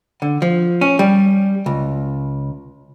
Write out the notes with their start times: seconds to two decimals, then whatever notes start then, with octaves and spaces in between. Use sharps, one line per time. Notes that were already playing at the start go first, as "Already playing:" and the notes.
0.22 D3
0.42 F3
0.81 C#4
0.99 G3
1.66 C#2